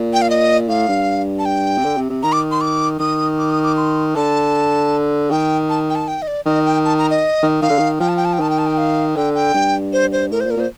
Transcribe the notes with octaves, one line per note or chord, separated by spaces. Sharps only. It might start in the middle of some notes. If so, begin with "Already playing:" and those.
Already playing: A#2
G5
F5
D#5
A2 F5
G2
A5
G5
C3
D3
C3
C3
D#3 A#5
D6
C6
D6
D#3 D#6
D6
D#6
D6
C6
D3 A5
D#3 G5
A5
G5
A5
G5
D#5
D5
D#3 D#5
G5
A5
A#5
D#5
D#3
D#3 F5
D3
D#3
F3 G5
A5
G5
A5
G5
D#3 A5
G5
A5
G5
F5
D3 G5
G5
G2
C5
C5
A2 A#4
C5
A#2
A#4
A#2 C5